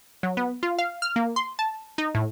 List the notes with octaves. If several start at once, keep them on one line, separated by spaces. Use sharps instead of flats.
F#3
B3
F4
F5
F6
A#3
C6
A5
D#4
A2